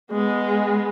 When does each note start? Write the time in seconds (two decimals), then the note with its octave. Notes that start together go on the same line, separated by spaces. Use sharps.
0.12 G#3 B3